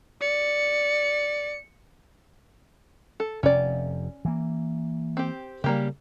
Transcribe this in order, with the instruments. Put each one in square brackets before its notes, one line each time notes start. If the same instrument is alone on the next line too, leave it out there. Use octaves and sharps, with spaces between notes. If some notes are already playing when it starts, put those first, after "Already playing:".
[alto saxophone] D5 [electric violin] C#7
[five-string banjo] A4
[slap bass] F1 C3 [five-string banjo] C#4 D5
[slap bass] E3 A#3
[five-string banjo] C4 G4
[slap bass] C#3 [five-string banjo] G3 A#3 G4